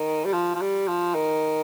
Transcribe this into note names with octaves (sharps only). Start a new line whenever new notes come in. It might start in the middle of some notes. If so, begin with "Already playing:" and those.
Already playing: D#3
G3
F3
F3
G3
F3
D#3